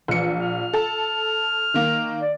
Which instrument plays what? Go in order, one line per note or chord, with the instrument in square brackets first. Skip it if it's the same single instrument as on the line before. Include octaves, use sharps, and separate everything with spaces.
[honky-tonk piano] A#1 C#7 [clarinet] E3
[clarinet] F6
[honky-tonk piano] A4 A5
D#3 A#3
[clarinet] D5